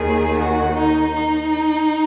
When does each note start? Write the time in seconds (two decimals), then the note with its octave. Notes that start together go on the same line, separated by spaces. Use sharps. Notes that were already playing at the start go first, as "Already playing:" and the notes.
Already playing: D#2 D#3 G#4
0.40 F#4
0.78 D#4
1.15 D#4